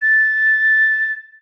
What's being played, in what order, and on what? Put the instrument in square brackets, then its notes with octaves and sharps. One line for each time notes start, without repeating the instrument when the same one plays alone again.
[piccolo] A6